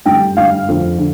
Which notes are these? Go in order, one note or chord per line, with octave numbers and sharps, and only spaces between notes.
G2 D3 G5
G2 D3 F5
F2 D3
D3